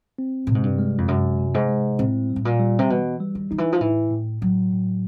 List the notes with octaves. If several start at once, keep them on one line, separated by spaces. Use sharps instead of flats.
C4
A2 C3
G#2
G2
G#3
F2
F#2 C3
C3
G#2
G#3
A2 C4
G3
A2
A#2
G3
C3
B2 E3
G3
D#3
D#3 D#4
E3
F3
A2 E3
A2
A2 F#3
A2